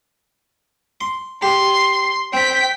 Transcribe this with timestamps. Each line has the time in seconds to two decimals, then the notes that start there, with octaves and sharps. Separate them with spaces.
1.01 C6
1.42 G4 C6
2.33 C4 G5 B6